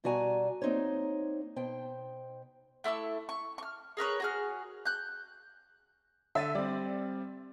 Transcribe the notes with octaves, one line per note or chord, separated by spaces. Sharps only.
B2 G3 F#4 D5 G#5 A#5
A#3 C4 D#4 C5 C#5
B2 C5 G5
A3 E4 C#6 E6
C#6
C#6 F6
G#4 A#4 B4 C#5
F#4 G#4 F6
F#6 G6
D3 E5 A6 D#7
G3 C4 D5